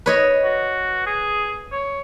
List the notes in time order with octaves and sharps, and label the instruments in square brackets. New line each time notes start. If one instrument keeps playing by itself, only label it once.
[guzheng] B4 C#5 D#5
[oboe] F#4
G#4
C#5